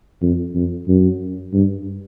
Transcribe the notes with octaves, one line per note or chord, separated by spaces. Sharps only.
F2
F2
F#2
G2